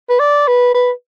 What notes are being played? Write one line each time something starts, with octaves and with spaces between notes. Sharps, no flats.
B4
D5
B4
B4